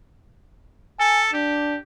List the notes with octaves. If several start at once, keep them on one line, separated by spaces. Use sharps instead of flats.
A4 G#5
D4 G4